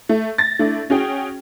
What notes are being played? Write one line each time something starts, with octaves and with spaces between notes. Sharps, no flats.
A3
A6 A#6
A3 D4 E4
C#4 F#4 G#4 G5